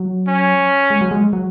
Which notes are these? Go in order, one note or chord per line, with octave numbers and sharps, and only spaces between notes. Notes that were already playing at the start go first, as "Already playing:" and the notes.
Already playing: F#3
C#4
G#3
F#3
G#3
F#3